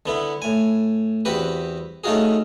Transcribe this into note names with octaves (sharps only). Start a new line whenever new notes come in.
D3 B3 E4
A2 G#5
E2 C4 F#4 G4 B4
A3 C#4 D#4 F4 F#4 G#4